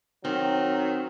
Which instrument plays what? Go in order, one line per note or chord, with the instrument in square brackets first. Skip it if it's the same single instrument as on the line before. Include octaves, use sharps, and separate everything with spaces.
[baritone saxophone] D#3 [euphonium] F#3 [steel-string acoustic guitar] C4